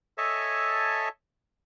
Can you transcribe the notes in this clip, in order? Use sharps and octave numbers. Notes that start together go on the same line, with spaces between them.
A4 C#5 D#5 E5 G#5 A5